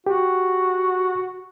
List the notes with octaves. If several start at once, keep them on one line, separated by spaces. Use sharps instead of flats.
F#4 G4